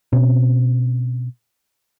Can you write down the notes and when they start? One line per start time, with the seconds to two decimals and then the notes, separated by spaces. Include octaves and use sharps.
0.13 B2 C4 C#4